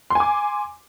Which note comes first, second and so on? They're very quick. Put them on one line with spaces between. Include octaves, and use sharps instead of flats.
C6 G#5 D6